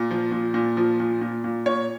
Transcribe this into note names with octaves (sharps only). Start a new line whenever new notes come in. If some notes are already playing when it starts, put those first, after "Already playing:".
Already playing: A#2
F3
A#2
A#2
F3
A#2
A#2
A#2
A#2 C#5